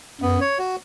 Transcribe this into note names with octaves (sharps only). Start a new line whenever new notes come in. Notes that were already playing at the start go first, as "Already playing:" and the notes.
F#2 B3
C#5
F#4